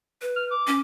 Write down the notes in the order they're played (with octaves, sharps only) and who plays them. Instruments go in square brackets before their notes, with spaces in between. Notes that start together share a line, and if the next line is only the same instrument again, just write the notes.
[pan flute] B4
[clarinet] F6
D6
[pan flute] C#4